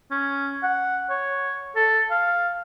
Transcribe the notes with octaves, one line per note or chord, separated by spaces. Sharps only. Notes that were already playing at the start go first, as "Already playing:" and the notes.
C#4
F#5
C#5
A4
F5